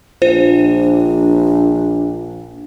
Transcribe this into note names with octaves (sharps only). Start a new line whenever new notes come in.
A#1 D4 F4 C5